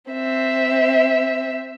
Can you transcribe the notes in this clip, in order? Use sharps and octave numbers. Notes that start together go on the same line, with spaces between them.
C4 E5